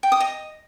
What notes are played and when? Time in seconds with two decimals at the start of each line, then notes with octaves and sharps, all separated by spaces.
0.03 G5
0.12 D#6
0.20 D#5